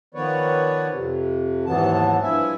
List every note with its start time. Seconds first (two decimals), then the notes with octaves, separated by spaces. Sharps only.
0.15 D#3 F3 B3 B4 C#5 D5
0.91 F2 C3
1.66 D#2 G#2 E3 F#3 B3 A5
2.22 G2 F3 E4 E5 G#5